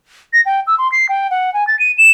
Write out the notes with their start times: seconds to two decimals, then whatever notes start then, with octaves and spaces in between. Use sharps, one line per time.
0.33 A#6
0.46 G5
0.67 E6
0.78 C6
0.92 C7
1.09 G5
1.30 F#5
1.54 G#5
1.67 A6
1.79 D#7
1.98 E7